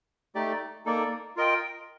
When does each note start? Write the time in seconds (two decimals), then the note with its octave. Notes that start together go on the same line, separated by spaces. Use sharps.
0.35 A3 D#4 G4 D5
0.85 A#3 D#4 A4 D5
1.36 F4 A#4 D#5 G5